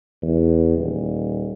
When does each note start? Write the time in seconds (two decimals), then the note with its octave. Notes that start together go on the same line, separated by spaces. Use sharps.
0.23 E2
0.78 D#1